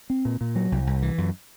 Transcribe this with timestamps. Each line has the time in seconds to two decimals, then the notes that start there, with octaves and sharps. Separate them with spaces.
0.10 C4
0.25 A#2
0.41 A#2
0.56 F#3
0.72 C2
0.87 C2
1.02 E3
1.18 F#2